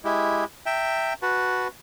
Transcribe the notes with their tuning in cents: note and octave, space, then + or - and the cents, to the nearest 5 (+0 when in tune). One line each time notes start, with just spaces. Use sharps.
G#3 +0 E4 +0 G4 +0
E5 +0 G5 +0 A#5 -35
F#4 +0 B4 +0 A5 +0